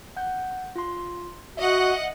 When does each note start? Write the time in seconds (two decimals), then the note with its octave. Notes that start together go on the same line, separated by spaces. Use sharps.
0.17 F#5 G6
0.76 F4 C6
1.57 F#4 D#5 E5 F#5